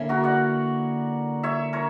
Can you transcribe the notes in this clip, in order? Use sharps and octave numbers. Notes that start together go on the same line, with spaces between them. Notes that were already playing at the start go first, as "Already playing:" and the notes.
Already playing: D3 A#3 C#4 E4 E5
F#4 A#4
D5 F#5
C#5 E5
A#4 C#5